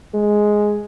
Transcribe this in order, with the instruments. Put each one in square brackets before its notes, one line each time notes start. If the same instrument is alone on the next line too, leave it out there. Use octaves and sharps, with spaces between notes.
[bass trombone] G#3